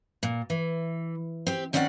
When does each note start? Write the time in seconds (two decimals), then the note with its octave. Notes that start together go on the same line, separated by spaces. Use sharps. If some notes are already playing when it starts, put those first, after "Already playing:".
0.23 A#2
0.50 E3
1.47 C4 G4
1.73 D#3 C4 C#4 D5 D#5 F#5